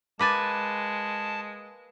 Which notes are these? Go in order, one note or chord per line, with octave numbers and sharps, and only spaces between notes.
G#3 A#3 B4 G#5 A5 D6 A6